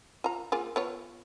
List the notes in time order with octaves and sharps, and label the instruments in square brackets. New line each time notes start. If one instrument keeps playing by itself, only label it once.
[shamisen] F4 A#5
A#3 F4 G#4
B3 F4 C#5